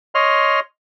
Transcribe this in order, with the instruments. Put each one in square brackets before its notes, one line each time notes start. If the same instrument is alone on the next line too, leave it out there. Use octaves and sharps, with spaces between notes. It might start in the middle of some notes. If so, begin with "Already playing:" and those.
[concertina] C#5 D#5 C6 F6